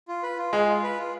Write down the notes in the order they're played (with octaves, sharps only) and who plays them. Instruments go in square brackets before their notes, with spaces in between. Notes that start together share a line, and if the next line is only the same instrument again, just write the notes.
[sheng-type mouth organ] F4
B4
F4
[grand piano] G#3 [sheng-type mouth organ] G#4
[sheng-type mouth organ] F4
B4
F4